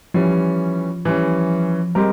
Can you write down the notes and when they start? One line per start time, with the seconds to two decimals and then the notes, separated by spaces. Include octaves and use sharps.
0.14 E3 F3 G3 C#4
1.05 E3 G3 C#4
1.95 G3 G#3 C4 G4 A#4